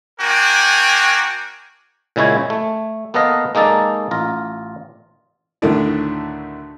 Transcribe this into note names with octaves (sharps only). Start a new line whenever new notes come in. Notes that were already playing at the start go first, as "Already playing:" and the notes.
A#3 D4 F#4 A#4 G5 G#5
A#2 C#3 G#3 E4 C#5 G#5
A3
A#3 B3 A4 B4 D#5 F5
G#3 A#3 D#4 A4 D5
A1 F4 A#5
D2 A2 D#3 A3 D4 E4